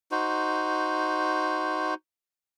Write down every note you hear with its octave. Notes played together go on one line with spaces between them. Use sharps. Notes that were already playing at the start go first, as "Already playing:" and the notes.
D#4 F#4 C5